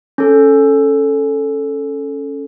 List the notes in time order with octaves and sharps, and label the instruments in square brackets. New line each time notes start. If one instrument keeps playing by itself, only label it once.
[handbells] C#4 A4